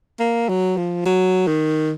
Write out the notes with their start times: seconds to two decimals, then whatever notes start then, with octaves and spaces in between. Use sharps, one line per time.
0.20 A#3
0.49 F#3
0.77 F3
1.06 F#3
1.47 D#3